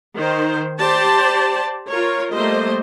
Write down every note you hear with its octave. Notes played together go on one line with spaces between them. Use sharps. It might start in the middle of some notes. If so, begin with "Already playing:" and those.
D#3 C5
G4 C5 D5 A5
F4 A#4 C#5
G3 A3 A#3 C5 D#5